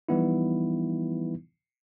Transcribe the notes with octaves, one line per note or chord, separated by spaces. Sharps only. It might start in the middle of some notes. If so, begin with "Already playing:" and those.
E3 F3 G3 B3 D#4 E4